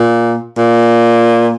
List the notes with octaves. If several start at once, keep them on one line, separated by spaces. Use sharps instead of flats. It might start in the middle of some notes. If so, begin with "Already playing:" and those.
Already playing: A#2
A#2